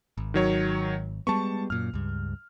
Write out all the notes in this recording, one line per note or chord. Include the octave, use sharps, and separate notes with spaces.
G#1
D#3 F#3 C#5
G3 G#3 B3 A5 C#6
F#2 A#2 F6
C#2 G2